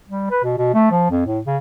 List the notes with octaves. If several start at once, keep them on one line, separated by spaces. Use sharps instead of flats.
G3
B4
B2
B2
A3
F3
F2
A2
C#3